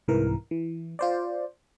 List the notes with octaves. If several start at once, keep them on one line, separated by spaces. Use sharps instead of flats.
C2 G#2 E3 A#4
E3
F4 C5 D5